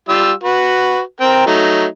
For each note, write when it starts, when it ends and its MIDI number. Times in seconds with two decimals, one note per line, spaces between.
0.09 0.31 55
0.09 0.31 65
0.09 0.31 88
0.44 1.00 66
0.44 1.00 71
1.20 1.43 60
1.20 1.43 70
1.20 1.43 79
1.47 1.85 54
1.47 1.85 57
1.47 1.85 63